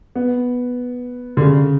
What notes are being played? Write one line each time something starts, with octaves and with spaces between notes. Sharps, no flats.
B3
D3
C#3